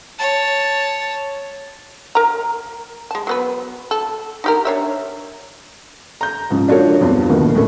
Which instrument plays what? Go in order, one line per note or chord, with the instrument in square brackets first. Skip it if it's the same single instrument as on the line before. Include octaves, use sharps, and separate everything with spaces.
[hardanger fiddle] C#5 A5
[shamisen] A#4 A#5
G#3 A5
F#3 B3 B4
A4
D#4 G4 A#4
D4 C#5 E5
[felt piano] A#5 G6
G#2 C#3 F3
F3 D4 F4 F#4 A4 C#5
E2 G2 C4 F4
D#1 D2 D#3 F3 B3
F2 A2 C#4 A4